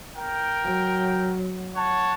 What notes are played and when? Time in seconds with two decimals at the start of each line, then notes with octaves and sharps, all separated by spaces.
0.17 A#4 G5
0.62 F#3
1.76 C#5 F#5 A5